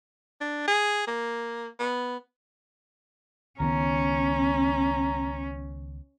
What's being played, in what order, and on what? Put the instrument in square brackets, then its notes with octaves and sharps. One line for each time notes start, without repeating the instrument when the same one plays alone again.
[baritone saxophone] D4
G#4
A#3
B3
[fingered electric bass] C#2 D#3 B3 [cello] C#4 [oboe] A#5